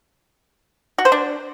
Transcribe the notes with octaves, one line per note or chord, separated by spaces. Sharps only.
F#4
C5
D4